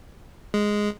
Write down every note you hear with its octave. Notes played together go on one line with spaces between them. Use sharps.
G#3